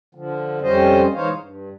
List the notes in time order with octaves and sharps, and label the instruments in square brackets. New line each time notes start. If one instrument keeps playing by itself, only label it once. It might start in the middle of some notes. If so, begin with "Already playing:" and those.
[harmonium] D3 F3
F2 G3 C#4 C5 D#5
G#2 E3 D#4 C5 C#5 F5
G2